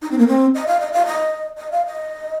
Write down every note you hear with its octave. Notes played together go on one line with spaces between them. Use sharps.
D#4
C4
A#3
C4
D#5
F5
D#5
F5
D#5
D#5
F5
D#5